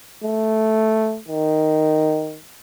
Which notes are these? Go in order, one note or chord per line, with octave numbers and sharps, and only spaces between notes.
A3
D#3